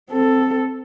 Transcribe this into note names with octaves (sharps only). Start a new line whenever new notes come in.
C4 A4